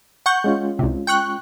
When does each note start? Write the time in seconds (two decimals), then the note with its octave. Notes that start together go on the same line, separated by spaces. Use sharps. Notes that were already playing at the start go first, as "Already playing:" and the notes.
0.26 F#5 C#6 G6
0.44 G#3 C#4 F4
0.79 C2 C3
1.07 G5 C#6 F#6